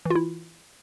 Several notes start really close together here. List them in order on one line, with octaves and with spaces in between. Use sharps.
E3 F4 E4